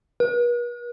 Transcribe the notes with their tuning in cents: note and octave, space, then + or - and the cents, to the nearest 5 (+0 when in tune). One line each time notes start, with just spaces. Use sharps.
B4 -45